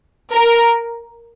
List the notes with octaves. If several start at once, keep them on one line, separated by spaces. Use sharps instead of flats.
A#4